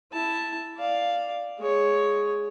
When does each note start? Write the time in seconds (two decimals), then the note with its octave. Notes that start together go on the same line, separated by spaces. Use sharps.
0.12 E4 A5
0.77 D5 F5
1.59 G#3 C#5